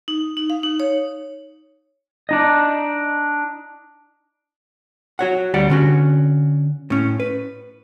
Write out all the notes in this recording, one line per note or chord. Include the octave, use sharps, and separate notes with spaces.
D#4
D#4
F5
D#4
C#5
D4 D#4 D#5
F#4 C#5 F#5
D2 G3 D5 F#5
D3 C#4 F#4
A2 C#4
B4